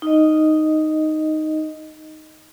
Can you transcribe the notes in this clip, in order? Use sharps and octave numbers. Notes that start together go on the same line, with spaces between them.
D#4 D#5